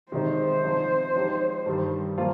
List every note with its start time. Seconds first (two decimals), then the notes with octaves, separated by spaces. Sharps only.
0.12 C3 D#3 G#3 D#4 C5
0.63 F3 C4 D#4
1.15 F3 G#3 D#4 G4 C#5
1.66 G2 D#3 G3
2.18 F3 A#3 F4